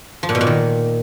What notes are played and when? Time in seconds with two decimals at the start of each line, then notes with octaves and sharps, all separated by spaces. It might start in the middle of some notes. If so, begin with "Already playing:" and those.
0.23 F3
0.29 A#2
0.35 B2
0.41 A#2
0.47 D#3